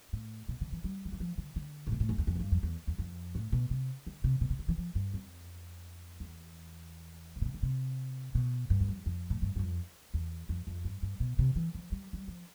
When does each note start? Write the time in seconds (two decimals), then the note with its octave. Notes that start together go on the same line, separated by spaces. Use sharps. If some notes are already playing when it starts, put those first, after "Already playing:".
0.13 A2
0.49 B2
0.61 D3
0.72 E3
0.84 G3
1.05 D3
1.12 E3
1.20 F3
1.38 D3
1.56 D3
1.87 A2
1.92 B2
2.00 A2
2.09 F2
2.18 E2
2.27 F2
2.36 A2
2.40 G2
2.52 F2
2.63 E2
2.87 E2
2.98 F2
3.35 A2
3.52 B2
3.71 C3
4.07 D3
4.24 C3
4.41 B2
4.50 C3
4.59 D3
4.69 E3
4.78 F3
4.95 G2
5.14 F2
6.20 E2
7.36 A2
7.42 B2
7.45 C3
7.54 D3
7.63 C3
8.35 B2
8.70 G2
8.80 E2
8.88 F2
9.06 F2
9.30 A2
9.42 G2
9.56 G2
9.59 F2
10.14 E2
10.49 F2
10.67 F2
10.85 G2
11.03 G2
11.20 B2
11.39 C3
11.56 E3
11.75 F3
11.92 G3
12.13 G3
12.28 F3